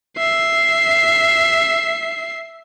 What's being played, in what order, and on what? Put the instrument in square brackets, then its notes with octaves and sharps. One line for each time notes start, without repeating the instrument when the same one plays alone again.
[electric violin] E5 C7